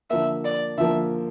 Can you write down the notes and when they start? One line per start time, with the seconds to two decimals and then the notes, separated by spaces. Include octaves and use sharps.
0.10 D3 F3 A#3 E5
0.45 D5
0.78 D3 F3 A#3 E5